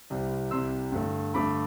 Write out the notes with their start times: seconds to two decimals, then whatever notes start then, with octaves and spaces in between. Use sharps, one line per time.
0.10 C2 C3 G3
0.51 C2 C3 G3 C6 E6
0.92 G2 D3 A3
1.34 G2 D3 A3 B5 D6